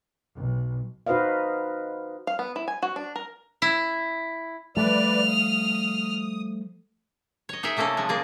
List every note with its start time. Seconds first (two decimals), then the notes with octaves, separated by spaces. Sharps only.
0.36 B1
1.07 D#4 F#4 B4 C5 D#5 F5
2.27 F5
2.39 B3
2.56 E4
2.68 G#5
2.82 F#4
2.96 D4
3.16 A#4
3.62 E4
4.77 F3 G3 A3 B4 D5 F6
5.29 D#6
7.49 C#5 D#5
7.63 D#4 G#4 A#4 D#5 E5
7.77 C3 A3 A#3 C#4 A4
7.97 F3 G#3
8.09 A#3 G#4 D5